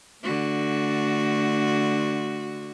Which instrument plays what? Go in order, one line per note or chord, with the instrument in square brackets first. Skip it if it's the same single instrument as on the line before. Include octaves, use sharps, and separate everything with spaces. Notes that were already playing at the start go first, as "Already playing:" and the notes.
[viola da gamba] D3 A3 F#4